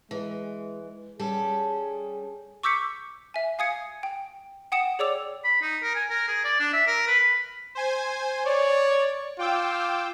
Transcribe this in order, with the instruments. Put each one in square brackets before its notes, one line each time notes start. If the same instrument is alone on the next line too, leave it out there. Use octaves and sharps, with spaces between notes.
[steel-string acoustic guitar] E3 [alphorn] G#3
[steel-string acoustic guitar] G3 C#4 A4 [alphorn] G#4
[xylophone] C#6 D6 E6 G6 B6 C#7
E5 G#5
F5 G#5 D#6 G#6 C#7
G5
F#5 G5 D#6 C#7 E7
G#4 C#5 D5 D6 E6 F7
[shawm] B5
D#4
A#4
G#5
A#4
G#4
D5
D4
E5
A#4
B4
B5
[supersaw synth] C5 G#5
[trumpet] C#5 [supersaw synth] D5
[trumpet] F4 [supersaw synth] G5 D6 E6